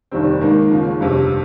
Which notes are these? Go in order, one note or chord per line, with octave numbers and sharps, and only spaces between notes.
F1 D#2 D#3 G3 C4
G#2 D#3 A#3
D#2 C#3 F3
G1 F2 C3